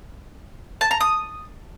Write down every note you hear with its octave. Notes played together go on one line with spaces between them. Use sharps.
A5
A#5
D#6